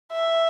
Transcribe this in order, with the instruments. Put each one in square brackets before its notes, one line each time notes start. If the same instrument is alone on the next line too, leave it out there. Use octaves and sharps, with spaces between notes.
[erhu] E5